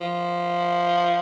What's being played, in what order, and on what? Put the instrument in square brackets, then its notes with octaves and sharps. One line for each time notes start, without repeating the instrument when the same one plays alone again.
[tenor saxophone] F3